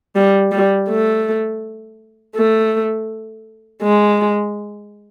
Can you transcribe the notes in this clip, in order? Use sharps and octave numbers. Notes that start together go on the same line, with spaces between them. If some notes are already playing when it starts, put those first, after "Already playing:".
G3
G3
A3
A3
G#3